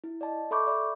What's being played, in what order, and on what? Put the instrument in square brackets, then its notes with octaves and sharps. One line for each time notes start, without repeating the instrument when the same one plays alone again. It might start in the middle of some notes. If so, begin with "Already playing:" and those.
[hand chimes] E4
D5 D#5 A5
A4 E5 B5 C#6 D6 G6
D5 E5 B5